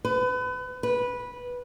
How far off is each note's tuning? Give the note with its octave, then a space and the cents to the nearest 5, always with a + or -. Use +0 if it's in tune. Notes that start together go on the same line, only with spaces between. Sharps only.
B4 +30
B4 -10